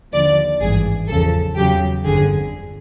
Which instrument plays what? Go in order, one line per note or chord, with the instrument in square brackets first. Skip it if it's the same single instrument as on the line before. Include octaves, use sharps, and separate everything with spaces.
[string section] D#2 D3 F3 D5
G#1 G2 E3 G#4
E2 C#3 F3 A4
E2 C#3 F#3 G4
G1 F2 D3 G#4